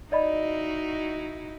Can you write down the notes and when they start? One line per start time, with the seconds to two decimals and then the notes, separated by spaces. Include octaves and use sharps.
0.12 D#4 E4 F#4 D5 D#5 B5